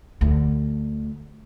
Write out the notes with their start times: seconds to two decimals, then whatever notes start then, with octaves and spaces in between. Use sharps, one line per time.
0.21 D2